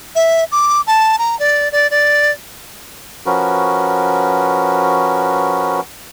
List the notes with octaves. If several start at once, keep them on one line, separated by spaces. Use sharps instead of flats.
E5
D6
A5
A#5
D5
D5
D5
F3 C#4 F#4 A#4 B4